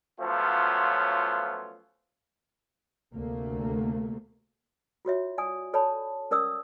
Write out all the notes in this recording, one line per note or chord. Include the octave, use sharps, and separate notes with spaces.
F3 F#3 A3 B3 C#4 F4
D2 C3 A3 A#3
F4 F#4 C#5 E5
D5 G#5 D#6
A4 C#5 D5 A5 B5
C#4 A#4 D5 D#6 E6